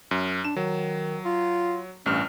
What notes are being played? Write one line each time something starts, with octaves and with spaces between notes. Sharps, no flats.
F#2
D4 E7
D#3 F#3
F4
A1 G2 C#4 F6